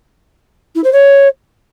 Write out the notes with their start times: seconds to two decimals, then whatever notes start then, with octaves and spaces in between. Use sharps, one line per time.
0.75 E4
0.84 C5
0.93 C#5